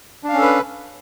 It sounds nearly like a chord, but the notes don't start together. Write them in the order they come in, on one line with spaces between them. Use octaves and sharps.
D4 F5 C#4 A4 B4